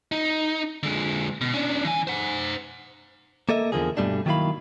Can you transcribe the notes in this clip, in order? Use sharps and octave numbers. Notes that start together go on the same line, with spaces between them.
D#4
D3 G#3
B2
C#4 D4
E3 G#5
C5 F#5
A#3 A4 D#5 E5
E2 G#2 D3 F3 A#3 G#4
G2 B2 G3 A3 D4
D#3 F#3 A#3 E4 F5 B5